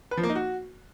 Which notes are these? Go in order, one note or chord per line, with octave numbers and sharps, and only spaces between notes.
B4
F3
A#3
D#4
F#4